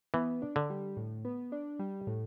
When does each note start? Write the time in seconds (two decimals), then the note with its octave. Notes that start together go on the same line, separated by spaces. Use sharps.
0.14 E3 B3
0.42 D4
0.56 D3
0.70 G3
0.97 A2
1.25 B3
1.52 D4
1.79 G3
2.07 A2